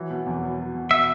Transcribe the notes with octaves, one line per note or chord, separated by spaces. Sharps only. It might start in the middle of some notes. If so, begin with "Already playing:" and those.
Already playing: E3 F#3
B2
E2
F#3
F#3
B2
E5